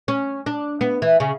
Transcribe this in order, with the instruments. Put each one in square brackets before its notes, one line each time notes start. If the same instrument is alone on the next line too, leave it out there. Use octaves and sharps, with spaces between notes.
[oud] C#4
D4
B3
E3
C#3